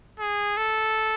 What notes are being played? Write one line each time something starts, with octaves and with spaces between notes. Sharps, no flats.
G#4
A4